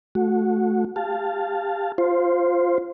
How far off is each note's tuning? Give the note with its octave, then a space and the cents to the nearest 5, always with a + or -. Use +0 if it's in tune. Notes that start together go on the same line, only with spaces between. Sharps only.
A3 -20 F#4 -15
G4 +25 F5 +0 A5 +0
F4 +0 C5 +0